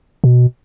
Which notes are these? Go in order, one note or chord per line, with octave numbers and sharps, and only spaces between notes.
B2